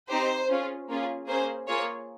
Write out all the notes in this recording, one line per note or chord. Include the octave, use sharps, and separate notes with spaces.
C4 D#4 G4 C5
C#4 F4 G#4
A#3 C#4 F4 G#4
A#3 C#4 G#4 C5
A#3 F4 G#4 C#5